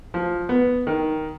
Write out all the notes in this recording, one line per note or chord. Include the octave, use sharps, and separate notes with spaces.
F3
B3
D#3